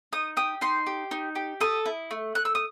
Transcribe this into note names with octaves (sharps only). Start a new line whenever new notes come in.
D#4 D#6
G4 D#6
D#4 C6
G4
D#4
G4
A4 D#6
E4
A3
A3 F#6
E6
D#6